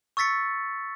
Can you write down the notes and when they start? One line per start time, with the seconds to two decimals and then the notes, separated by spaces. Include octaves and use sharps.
0.17 C#6 E6 A6 B6 C#7